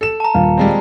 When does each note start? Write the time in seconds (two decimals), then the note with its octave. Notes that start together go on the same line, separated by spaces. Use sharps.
0.01 A4 E7
0.20 A5 A#5
0.34 D#1 F5
0.58 G3 G#3 C4